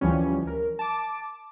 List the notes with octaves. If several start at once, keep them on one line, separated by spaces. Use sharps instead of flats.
D2 E3 F3 G3 C#4
A#4
A5 D6